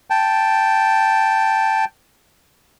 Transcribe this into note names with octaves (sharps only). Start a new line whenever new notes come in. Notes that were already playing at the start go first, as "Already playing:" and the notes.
G5 A5